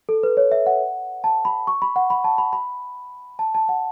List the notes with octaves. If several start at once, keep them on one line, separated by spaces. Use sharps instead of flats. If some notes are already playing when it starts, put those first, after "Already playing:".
A4
B4
C#5
E5
F#5
A5
B5
C#6
B5
F#5
B5
A5
B5
B5
A5
A5
F#5